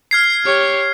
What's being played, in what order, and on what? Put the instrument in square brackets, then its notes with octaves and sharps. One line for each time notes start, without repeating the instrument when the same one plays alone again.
[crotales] F6 G#6 C7
[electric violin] G4 C#5